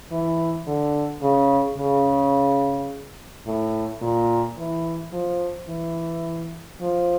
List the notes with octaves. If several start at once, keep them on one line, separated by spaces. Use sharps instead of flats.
E3
D3
C#3
C#3
A2
A#2
E3
F3
E3
F3